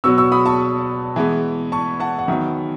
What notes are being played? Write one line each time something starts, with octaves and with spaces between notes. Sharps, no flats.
B2 F#3 B3 C#6 E6
C#6 E6
B5 D#6
A5 C#6
E3 G#3 B3
A5 C#6
F#5 A5
F#5
D#3 F#3 B3 E5